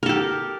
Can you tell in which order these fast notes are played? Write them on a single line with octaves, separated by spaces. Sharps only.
A#4 A4 G4